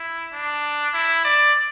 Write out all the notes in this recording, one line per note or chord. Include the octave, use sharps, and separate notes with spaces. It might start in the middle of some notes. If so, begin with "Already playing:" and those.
Already playing: E4
D4
E4
D5